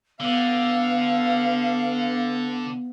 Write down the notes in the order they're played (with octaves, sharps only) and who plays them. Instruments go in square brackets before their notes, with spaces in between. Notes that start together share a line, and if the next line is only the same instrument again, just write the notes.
[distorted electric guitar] D3 [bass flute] B3 [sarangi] F5